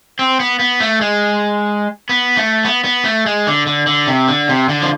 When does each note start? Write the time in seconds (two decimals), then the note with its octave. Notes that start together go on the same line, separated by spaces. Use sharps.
0.19 C4
0.40 B3
0.59 B3
0.81 A3
1.01 G#3
2.09 B3
2.37 A3
2.65 B3
2.84 B3
3.05 A3
3.26 G#3
3.47 D3
3.67 D3
3.87 D3
4.07 C3
4.28 D3
4.49 C3
4.69 D3
4.82 F3